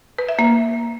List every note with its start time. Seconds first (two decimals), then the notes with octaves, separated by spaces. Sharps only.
0.19 B4
0.29 E5
0.39 A#3